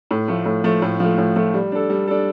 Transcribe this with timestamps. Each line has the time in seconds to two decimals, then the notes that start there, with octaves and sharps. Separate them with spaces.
0.11 A2
0.28 F3 A3
0.46 A2
0.64 F3 A3
0.82 A2
1.00 F3 A3
1.18 A2
1.36 F3 A3
1.54 G3
1.72 D4 A4
1.90 G3
2.08 D4 A4